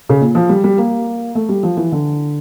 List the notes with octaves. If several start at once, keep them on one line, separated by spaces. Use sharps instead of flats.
C#3
A#2
F3
G3
G3
A#3
A3
G3
F3
E3
D3